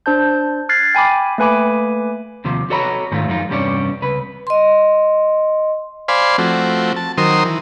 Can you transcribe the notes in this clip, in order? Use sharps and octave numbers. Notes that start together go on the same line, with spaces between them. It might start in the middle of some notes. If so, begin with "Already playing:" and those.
D4 C5 A5 G6
F6 F#6 G#6 A6 C7
G5 G#5 B5 D6
A3 A#3 B4 G#5 B5 D6
D#2 C3 F3
F#4 A4 C#5 D#5 A#5 B5
G#2 D#3 G#3 A3 F4
F#2 F3 G#3 D#4 F4
E2 G2 C3 G3 C#4 D4
C#2 B4
D#5 C6
C5 D5 F5 G#5 B5 C6
F3 A3 C4 F#4
A5
D#3 F#3 A#4 C5 C6 D#6
E3